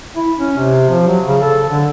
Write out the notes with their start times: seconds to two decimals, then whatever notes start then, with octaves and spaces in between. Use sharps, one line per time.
0.16 E4
0.39 C#4
0.58 C3
0.89 F3
1.07 F#3
1.27 C#3
1.41 A4
1.70 D3